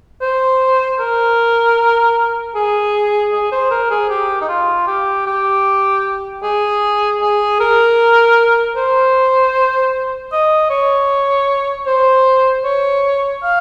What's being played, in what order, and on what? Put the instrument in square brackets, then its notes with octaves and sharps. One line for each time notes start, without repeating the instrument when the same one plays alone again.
[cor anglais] C5
A#4
G#4
G#4
C5
A#4
G#4
G4
D#4
F4
G4
G4
G#4
G#4
A#4
C5
D#5
C#5
C5
C#5
F5